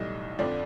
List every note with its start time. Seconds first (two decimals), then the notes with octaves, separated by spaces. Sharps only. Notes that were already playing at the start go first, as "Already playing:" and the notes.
Already playing: B1 A2 E3 G3 D#5
0.39 F2 D3 F3 D5